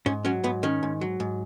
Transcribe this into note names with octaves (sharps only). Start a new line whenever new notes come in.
G#2 C#4
F#3 C#4
G#2 B3
D#3 C#4
G#2
F#3
G#2